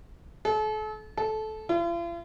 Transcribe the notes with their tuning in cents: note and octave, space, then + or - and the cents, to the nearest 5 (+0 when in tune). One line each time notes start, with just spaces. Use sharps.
A4 -40
A4 -20
F4 -45